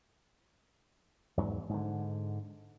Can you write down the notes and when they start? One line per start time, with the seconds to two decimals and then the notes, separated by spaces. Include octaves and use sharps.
1.37 E2 G#2 F#3
1.69 G#2 D3